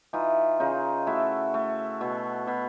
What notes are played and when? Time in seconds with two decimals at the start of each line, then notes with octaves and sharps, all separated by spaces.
0.13 E3 D#4 F4
0.60 C#3 D#4 F4
1.07 A3 E4 F#4
1.54 A3
2.01 B2
2.47 B2